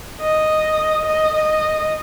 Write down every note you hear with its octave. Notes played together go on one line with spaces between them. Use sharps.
D#5
D#5
D#5